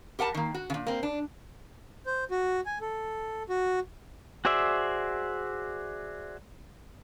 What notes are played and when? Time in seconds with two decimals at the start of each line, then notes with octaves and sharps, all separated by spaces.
0.19 G4 A#4 F#5 G#5 A5
0.34 D#3 A#3
0.54 F#4
0.70 A#2 C#3
0.87 A#3 C4
1.03 D4
2.06 C5
2.31 F#4
2.66 G#5
2.81 A4
3.49 F#4
4.45 F#4 G#4 C5 D5 E5